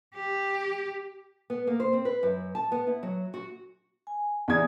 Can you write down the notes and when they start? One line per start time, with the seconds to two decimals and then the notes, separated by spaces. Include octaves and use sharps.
0.14 G4
1.50 B3
1.67 A#3
1.80 C5
1.93 C4
2.05 B4
2.23 F#2
2.55 A5
2.72 B3
2.87 E4
3.03 F#3
3.34 F#4
4.07 G#5
4.48 E2 D5 G#5 D#6 G#6